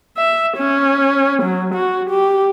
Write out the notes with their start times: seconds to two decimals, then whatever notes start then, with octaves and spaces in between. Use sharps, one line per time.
0.17 E5
0.57 C#4
1.42 F#3
1.75 F#4
2.10 G4